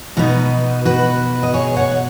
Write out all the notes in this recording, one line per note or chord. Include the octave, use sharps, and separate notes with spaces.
B2 B3 D#4 F#4 B4
F#4 B4
D#5
G#4 C#5
C#5 F#5
F#5